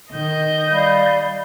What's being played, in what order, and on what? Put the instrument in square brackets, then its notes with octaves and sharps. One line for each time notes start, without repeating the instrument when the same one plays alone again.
[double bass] D#3 [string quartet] D#5 G6
[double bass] G3 [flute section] D5 F5 B5